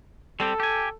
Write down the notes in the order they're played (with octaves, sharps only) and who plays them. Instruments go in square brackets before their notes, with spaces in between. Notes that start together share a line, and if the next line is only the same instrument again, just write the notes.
[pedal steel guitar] G3 C4 G4 [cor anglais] A4
[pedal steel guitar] G4 G#5